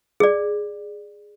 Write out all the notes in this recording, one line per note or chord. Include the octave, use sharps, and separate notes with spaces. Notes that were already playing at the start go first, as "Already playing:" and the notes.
G#4 D5